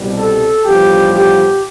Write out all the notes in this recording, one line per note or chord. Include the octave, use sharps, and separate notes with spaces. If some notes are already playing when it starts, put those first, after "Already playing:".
Already playing: C2 B2 G3
A4
A1 G2 F3 B3 G4
G4